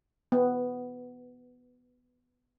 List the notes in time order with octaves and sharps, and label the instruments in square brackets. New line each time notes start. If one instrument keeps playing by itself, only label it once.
[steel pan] B3